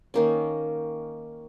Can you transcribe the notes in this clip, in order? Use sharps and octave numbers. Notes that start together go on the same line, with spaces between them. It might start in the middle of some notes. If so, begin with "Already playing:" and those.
D#3 A#3 C#4